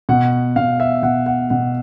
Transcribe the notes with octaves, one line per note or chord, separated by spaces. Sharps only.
B2 F#5
B2 F5
E5
B2 F#5
F#5
B2 F#5